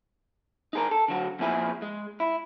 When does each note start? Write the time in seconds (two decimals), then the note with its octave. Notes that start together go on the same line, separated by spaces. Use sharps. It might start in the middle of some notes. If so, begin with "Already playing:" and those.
0.73 D#4 G#4 A#4
0.91 A4
1.08 D3 F#3 F#4
1.39 F2 A#2 E4 G#4
1.82 G#3
2.20 E4